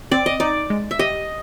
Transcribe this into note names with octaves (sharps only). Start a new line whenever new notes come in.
C4 D5
D#5
D#4 D5
G#3
E5
G4 D#5